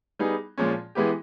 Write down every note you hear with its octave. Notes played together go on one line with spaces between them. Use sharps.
G3 B3 D#4 G#4
A#2 F3 G#3 C#4
E3 G#3 B3 E4 G4